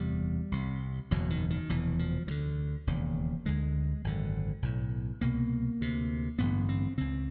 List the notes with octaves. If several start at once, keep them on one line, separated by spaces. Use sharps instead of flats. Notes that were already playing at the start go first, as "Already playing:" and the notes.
Already playing: F#1 E2 C3 G3
C2 C3
F#1 E2 B2 F#3
D#3
D#3
F1 E2 B2 E3
F3
D2 D3 F#3
E1 D#2 C#3
D2 D3 G#3
G#1 F#2 D3
B1 A2
C2 B2 A#3
D2 C3
A1 G2 D3 B3
C4
C#2 C#3 C4